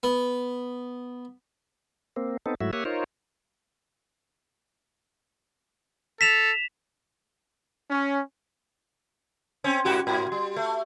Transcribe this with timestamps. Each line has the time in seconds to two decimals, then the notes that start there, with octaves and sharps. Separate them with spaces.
0.03 B3
2.16 A#3 C4
2.46 B3 C4 D#4 A4
2.61 G#2 F#3 A3 E4 F#4 E5
2.73 A#3 G4 C#5 E5 F#5 G#5
2.85 D#4 F4 A#4 C5 C#5
6.21 A4 B6 E7 F7
7.89 C#4
9.64 C4 C#4
9.85 G#2 F#4 G4
10.07 G#2
10.32 G3
10.56 A3